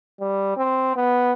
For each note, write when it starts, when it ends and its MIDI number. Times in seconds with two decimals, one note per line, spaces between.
0.20 0.57 55
0.57 0.91 60
0.96 1.33 59